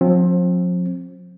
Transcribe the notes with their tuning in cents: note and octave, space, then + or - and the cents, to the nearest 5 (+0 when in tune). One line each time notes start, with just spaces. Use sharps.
F3 +40 C4 +25